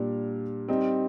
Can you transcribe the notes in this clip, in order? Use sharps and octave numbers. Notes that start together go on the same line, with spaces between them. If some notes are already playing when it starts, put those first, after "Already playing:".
Already playing: A#2 G3 D4
G3 C4 D#4